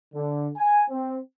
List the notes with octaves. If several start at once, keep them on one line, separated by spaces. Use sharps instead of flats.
D3
G#5
C4